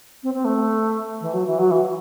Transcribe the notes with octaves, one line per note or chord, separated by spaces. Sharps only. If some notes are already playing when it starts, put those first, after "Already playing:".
C4
C4
A3
E3
F#3
E3
F#3
E3